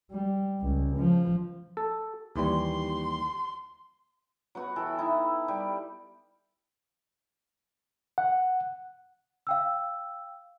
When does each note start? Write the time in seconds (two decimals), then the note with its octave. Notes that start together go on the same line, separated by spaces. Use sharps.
0.11 G3
0.60 C#2
0.97 F3
1.77 A4
2.36 D#2 E3 G3 C6
4.55 F#3 B3 F#4
4.76 E3 A4 G5
4.99 D#4 E4
5.48 G3 G4
8.18 F#5
9.47 F5 G5 E6